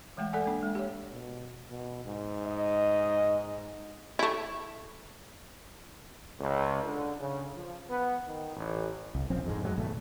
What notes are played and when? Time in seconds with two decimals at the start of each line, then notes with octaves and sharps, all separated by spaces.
0.17 E3 G#3 A3 G5
0.33 A4 D5 F#5 G#5
0.46 A#3 D4
0.63 G#3
0.75 G4 C#5
1.11 B2
1.70 B2
2.05 G#2
2.46 D#5
4.19 A3 E4
6.40 C#2
6.83 D3
7.19 C#3
7.56 F3
7.89 B3
8.26 D#3
8.56 A1
9.15 C2
9.30 A#1 F3 C4 C#4
9.44 D1 F2 G#2 G#3
9.63 F#2 A2 F#3 G#3
9.78 G#1 B2 A3